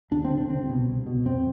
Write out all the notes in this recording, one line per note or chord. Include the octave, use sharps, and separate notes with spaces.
D#2 D4
C4
D3
D4
C2 C4
B2
C2
B2
F2 C4